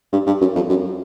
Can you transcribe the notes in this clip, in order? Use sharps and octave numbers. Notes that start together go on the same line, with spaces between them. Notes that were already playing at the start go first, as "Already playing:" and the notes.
G2
G2
F#2
F2
F#2